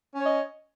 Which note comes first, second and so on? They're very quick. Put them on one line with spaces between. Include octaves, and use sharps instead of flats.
C#4 C#5 D#5